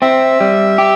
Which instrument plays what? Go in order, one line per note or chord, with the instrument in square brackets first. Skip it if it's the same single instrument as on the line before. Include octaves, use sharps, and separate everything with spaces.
[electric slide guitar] C4 [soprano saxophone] E5
[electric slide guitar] G3
G4